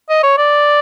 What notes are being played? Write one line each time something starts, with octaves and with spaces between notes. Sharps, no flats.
D#5
C#5
D5